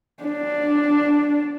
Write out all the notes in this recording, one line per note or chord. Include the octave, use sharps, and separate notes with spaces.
D4